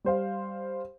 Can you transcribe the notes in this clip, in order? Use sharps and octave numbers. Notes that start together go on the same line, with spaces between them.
G3 C5 F5